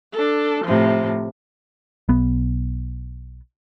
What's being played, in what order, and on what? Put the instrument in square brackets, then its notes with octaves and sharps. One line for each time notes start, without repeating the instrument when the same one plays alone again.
[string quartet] D4 A4
A2 C3 F3
[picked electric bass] B1 B3